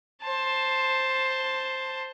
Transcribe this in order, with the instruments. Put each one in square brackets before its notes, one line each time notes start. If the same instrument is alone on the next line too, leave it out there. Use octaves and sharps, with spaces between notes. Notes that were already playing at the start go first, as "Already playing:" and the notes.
[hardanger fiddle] C5 A5